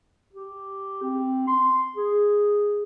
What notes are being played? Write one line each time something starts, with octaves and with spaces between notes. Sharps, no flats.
G4
C4
C6
G#4